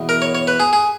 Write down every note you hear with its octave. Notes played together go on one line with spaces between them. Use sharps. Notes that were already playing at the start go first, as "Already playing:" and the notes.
Already playing: E2 B2
A#4
C#5
C#5
B4
G#4
G#4